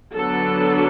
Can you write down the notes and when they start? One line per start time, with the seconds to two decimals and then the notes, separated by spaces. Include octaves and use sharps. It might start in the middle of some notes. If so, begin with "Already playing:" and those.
0.15 D3 F#3 B3 D4 A4